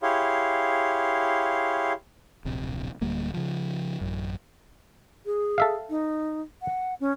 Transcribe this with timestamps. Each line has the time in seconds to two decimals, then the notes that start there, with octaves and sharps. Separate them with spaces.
0.03 E4 G4 G#4 C#5 F5 C6
2.45 D1 A#1 C3
3.01 D1 D2 G3 A#3
3.34 C#3 F3
4.01 A1 F#2
5.26 G#4
5.58 A4 E5 F5
5.90 D#4
6.62 F#5
7.00 C#4